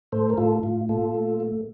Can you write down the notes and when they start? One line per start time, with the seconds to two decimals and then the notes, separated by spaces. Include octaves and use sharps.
0.12 A2 A4 C5
0.30 A#4
0.37 A2 F4 A4
0.63 A2 F4
0.89 A#2 F4 A4
1.14 A3
1.40 A3